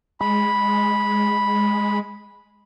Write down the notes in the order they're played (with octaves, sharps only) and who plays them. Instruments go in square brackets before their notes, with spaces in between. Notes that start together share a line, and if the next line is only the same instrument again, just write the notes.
[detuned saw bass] G#3 [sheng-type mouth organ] B5